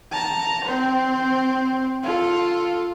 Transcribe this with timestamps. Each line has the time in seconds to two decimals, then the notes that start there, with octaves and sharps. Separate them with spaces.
0.12 A5 A#5
0.65 C4 C5
2.03 F4 A4